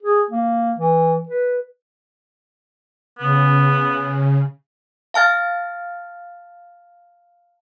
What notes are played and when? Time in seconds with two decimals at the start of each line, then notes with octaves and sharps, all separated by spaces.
0.03 G#4
0.30 A#3
0.78 E3
1.29 B4
3.19 C#3 B3
5.14 F5 A5 F6 A6